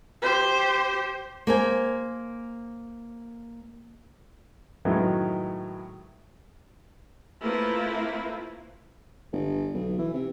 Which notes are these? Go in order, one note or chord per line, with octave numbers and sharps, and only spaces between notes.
G4 C5
A#3 C5 G#5
A2 D#3 F#3 G#3 B3
A3 A#3 C4 E4 F4 B4
G1
B1
E3
C3